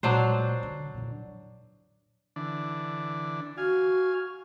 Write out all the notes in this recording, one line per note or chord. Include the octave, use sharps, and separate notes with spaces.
A#2 F#3 G#3 D4 C5
D3
E2 A#2
D3 E3 D4
F#4 F5 G#5